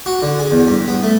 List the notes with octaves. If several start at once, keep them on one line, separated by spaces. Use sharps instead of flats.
F#4
D3
G#4
E2
G2
B3
A3